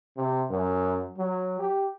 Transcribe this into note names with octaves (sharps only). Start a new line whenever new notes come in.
C3
F#2
F#3
G4